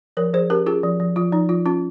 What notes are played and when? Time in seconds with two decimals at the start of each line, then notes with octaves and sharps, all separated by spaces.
0.17 F3 A#4 C#5
0.33 F3 G#4 C5
0.50 C#4 G4 A#4
0.66 C#4 F4 G#4
0.83 F3
1.00 F3
1.16 F3 F4
1.32 F3 D#4
1.49 F3 F4
1.66 C#4 F4